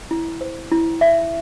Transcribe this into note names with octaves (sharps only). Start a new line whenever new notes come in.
E4
C5
E4
E5